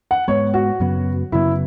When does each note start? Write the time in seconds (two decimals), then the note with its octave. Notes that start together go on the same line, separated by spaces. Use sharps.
0.11 F#5
0.28 G#2 G#3 B3 C#5
0.54 F#4
0.80 F#2 C#3 F#3 B3
1.32 F#2 C#3 F#3 B3 E4